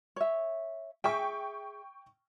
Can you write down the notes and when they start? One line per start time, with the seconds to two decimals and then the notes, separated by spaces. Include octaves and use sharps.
0.16 C#5 E5
1.04 G#4 E5 G5 C#6